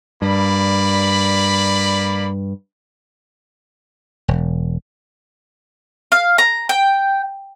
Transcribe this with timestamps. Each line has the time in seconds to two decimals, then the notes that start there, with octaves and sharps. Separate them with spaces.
0.22 G2 A#3 D5 B5
4.28 E1
6.12 F5
6.38 A#5
6.69 G5